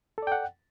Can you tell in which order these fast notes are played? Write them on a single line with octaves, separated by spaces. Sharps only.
A4 D5 G5 F#5